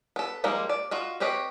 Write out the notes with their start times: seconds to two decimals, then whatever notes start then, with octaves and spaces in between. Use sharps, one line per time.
0.16 B3 A4
0.44 F3 G3 G#3 A#3 D#4
0.69 D5
0.91 F4 F#4 D#5
1.20 C4 G4 B4 C#5 D#5